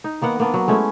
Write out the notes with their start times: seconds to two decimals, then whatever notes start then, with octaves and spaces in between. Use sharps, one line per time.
0.04 D#4
0.21 D#3 A#3 B3 F#5
0.40 A#3 B3 D4
0.54 F#3
0.68 G#3 A3 C#4 E4